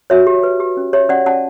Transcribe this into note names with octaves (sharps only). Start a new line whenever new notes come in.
F#4 C#5 E5
G4
B4
G4
C#4
G4 C#5 E5
C#4 D5 F#5
C#4 F#5 A5